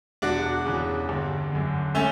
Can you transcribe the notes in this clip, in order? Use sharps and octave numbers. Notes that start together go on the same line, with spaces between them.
E1 D4 F#4
E2 C#3
G1
F#2 D3
A3 C#4